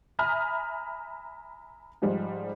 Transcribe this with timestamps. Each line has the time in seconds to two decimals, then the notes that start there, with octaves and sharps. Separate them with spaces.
0.19 E5 G#5 A#5 B5 D#6 F6
2.02 G#2 F3 G3 G#3